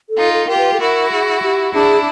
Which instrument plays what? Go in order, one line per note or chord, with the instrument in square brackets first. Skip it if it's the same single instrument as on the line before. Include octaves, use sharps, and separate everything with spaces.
[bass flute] A4
[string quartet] D#4 F4
[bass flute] A4
[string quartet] F4 G4 [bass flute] A#4
[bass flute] B4
A4
[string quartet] E4 F#4 [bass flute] A#4
[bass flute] G#4
G4
[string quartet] D4 E4 [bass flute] G#4